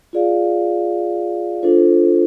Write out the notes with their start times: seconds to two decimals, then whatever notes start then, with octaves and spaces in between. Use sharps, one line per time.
0.13 F4 G#4 D5 F5
1.63 D4 F4 A4 C5